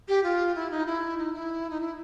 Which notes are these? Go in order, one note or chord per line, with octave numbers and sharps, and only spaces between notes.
G4
F4
E4
D#4
E4
D#4
E4
D#4
E4